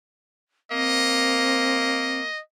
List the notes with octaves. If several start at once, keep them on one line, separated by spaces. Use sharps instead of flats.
A#3 C4 D#5